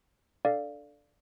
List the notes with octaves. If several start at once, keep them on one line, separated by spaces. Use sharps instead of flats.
D4 A4 D5 F5